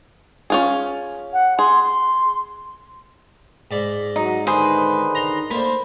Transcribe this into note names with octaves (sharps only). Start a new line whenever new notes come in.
C#4 F4 G#4
F#5
G#4 C6
C6
G#2 D5 B5
F#3 D#4
D3 D#3 D#4 G#4 B4 C5
A#5 C6
A3 A#3 D4 C5 B5